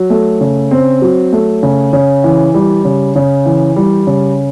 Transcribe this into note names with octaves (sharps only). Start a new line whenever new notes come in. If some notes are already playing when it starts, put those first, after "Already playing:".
Already playing: F#3
A3
C#3
C4
F#3
A3
C#3
C#3
E3
G3
C#3
C#3
E3
G3
C#3